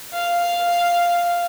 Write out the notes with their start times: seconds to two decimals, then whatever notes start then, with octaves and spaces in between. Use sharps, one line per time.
0.13 F5